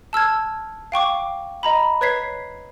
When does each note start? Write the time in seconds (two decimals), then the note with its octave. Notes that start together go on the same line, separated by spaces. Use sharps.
0.13 A5 E6 F6 G#6
0.92 F5 G5 C#6 D6
1.63 D#5 A#5 B5
2.01 B4 C#5 G#6 B6 C7